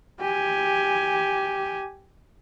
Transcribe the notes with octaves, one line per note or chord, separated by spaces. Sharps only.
G4 G#5